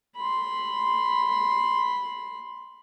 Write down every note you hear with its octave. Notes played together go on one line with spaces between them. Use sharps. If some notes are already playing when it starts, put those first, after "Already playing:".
B5 C6